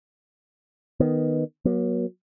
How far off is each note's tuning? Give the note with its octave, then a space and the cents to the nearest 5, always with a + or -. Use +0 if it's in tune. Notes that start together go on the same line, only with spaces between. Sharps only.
D#3 -5 B3 +0
F#3 +0 A#3 +45